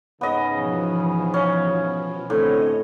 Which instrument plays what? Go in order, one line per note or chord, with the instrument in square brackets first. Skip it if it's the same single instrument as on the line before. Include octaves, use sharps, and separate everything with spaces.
[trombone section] G#2 C#3 [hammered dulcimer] B3 D#5
[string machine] B2 E3 F3
[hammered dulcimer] C#4
[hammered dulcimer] A2 [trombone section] D3 C4 [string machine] C#5 D#5